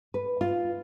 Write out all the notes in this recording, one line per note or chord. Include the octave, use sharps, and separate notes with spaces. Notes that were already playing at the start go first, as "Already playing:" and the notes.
B4
F4